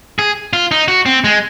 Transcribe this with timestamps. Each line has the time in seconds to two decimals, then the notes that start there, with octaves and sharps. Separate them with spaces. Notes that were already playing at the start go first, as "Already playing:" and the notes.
0.19 G#4
0.53 F4
0.71 D#4
0.88 F#4
1.06 C4
1.24 G#3